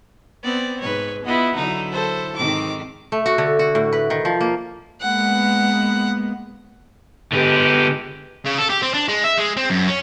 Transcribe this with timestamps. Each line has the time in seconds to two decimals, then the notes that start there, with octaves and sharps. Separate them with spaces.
0.43 B3 C4 D5
0.81 G#2 B4 C#5
1.25 B3 E4 F4 D#5 F#5
1.55 D3 F#3 D#4 E4
1.92 A4 C5
2.36 G#2 D#3 C4 D6
3.12 A3
3.26 F#4
3.38 D3
3.59 F#4
3.75 A2
3.93 B4
4.10 D#3
4.25 F3
4.41 A#3
5.01 G#3 A#3 B3 F#5
7.33 D3 G#3 B3 G4
8.45 C#3
8.58 A4
8.70 G4
8.82 C4
8.94 D4
9.08 G#3
9.24 E5
9.38 G#3
9.57 C4
9.70 F#2
9.88 C#4